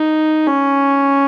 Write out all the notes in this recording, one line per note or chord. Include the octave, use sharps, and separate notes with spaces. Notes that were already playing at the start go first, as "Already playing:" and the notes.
Already playing: D#4
C#4